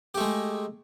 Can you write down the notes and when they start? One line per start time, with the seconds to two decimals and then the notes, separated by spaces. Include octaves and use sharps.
0.14 G4
0.17 A3
0.20 G#3